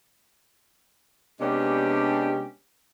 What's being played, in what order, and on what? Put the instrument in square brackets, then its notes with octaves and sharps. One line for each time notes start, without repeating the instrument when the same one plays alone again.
[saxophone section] C3 G#3 D4 [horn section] B3 C#4 G4